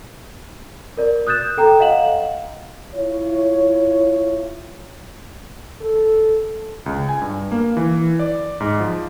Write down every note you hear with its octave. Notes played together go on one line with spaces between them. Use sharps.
A#4 D5
D#6 F#6 G6 A6 E7
A4 G5 A#5 E7
D#5 F5 F#5 E7 F#7
E4 F4 C#5
A4
C#2
G#5
G2
A#3
E3
D5
G#2
F3